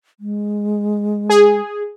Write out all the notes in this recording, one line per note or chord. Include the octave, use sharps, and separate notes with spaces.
G#3
G#4